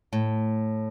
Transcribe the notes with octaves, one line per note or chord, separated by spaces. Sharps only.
A2